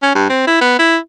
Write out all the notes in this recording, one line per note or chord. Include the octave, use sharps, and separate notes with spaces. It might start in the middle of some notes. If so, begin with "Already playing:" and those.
C#4
G2
C4
E4
B3
E4